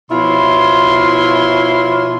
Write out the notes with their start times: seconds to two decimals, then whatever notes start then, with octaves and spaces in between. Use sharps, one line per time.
0.11 B2 F3 E4 F4 C#5 C6